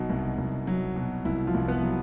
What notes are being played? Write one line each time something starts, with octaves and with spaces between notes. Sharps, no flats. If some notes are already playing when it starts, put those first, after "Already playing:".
Already playing: B2 F#3 D#4
C2
C2
F#3
B2
C2 E4
F3 F4
C2
B3 B4
F#3